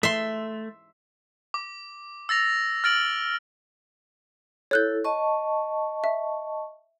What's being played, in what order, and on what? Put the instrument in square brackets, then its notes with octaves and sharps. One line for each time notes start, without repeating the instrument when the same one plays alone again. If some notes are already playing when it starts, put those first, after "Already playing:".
[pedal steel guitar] A3 [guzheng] E5 C6
[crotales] D6
E6 A6 A#6 F7
F6 A6 D7 F#7
[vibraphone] E4 A4 [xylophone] C#5 F#6 G6
[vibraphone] D#5 A5 C#6
[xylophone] E5